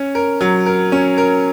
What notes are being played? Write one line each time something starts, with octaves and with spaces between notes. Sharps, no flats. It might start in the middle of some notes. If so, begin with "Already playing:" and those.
Already playing: C#4
A#4
F#3
A#4
C#4
A#4